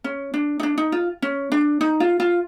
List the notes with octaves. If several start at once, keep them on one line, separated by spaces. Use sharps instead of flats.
C#4
D4
D#4
D4
D#4
F4
C#4
D4
D#4
F4
F4